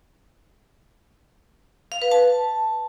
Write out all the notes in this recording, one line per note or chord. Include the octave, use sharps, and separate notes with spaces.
F5
B4
A5